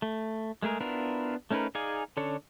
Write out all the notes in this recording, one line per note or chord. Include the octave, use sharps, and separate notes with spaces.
A3
G#3 A3 G#4 A#4
B3 D4 E4 F4 A#4
A3 C#4 D#4 A#4 B4
D#4 G#4 D5 F5 G#5
D3 C#4 D4 A4 C#5